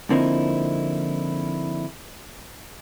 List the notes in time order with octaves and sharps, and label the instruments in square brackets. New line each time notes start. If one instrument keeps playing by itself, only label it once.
[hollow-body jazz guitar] D3 F3 A#3 C4 D#4 E4